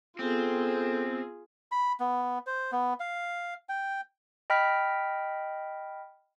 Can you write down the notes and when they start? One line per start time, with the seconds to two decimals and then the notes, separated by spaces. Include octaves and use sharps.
0.19 B3 C4 F4 G#4 A4
1.72 B5
2.00 B3
2.47 C5
2.72 B3
3.00 F5
3.69 G5
4.50 D#5 G5 B5 F6 B6